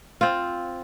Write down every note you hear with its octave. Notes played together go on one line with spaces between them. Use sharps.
C4 F4